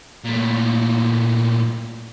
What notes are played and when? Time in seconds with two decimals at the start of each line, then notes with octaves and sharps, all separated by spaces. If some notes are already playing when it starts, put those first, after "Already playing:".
0.24 A#2 A3